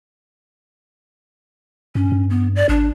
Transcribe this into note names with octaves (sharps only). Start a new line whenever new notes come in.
G2 C#4
G2
B3
D5
G#1 D4